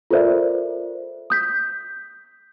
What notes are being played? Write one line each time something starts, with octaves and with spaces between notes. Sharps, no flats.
F4 A4 A#4 C5 D5 E5
D#6 G6 B6